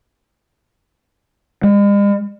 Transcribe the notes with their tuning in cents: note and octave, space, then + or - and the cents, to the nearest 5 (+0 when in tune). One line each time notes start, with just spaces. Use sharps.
G#3 -45